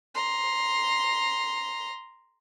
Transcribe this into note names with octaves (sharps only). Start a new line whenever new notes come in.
A#5 C6